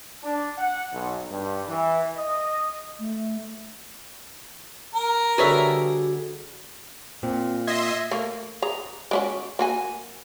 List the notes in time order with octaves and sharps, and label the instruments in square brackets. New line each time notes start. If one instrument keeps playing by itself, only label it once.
[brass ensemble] D4
F#5
B1
G2
E3
D#5
[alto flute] A3
[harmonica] A#4
[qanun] D3 G3 G#4 [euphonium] F#4 [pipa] B4 C#5 E5
[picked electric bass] A#2 [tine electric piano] C4
[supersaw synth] D#5 E5 C6 [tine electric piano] G#6 A#6
[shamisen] A3 A#3
G#4 A#5
G#3 C#4 F#4
A#3 F#4 G#5